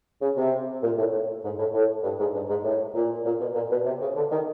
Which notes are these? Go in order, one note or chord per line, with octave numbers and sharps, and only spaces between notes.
C#3
C3
A#2
A2
A2
G#2
A2
A2
G2
G#2
G2
G#2
A2
A#2
A#2
B2
A#2
B2
C3
C#3
D3
D#3